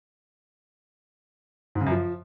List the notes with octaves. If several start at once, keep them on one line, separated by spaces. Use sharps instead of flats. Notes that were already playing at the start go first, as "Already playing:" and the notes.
G#2
C#3
F#2
F3